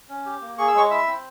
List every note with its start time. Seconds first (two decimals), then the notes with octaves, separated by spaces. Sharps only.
0.09 C#4
0.26 G4
0.42 A#3
0.58 G#4 C#6
0.68 E6
0.74 G#3 C#5 C#6
0.90 E4 E5 E6
1.07 C4